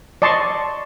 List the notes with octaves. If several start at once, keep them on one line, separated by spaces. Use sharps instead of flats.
D5 D#5 A5 C6 C#6